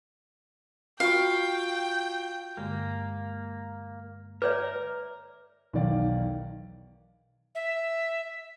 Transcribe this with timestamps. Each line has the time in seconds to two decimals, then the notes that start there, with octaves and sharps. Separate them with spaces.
1.00 F4 F#4 F5 G5 C#6
2.57 G2 D3 G#3 A#3
4.42 A#4 B4 C#5 D5 E5 D6
5.73 B1 E2 D#3 D5 F5
7.55 E5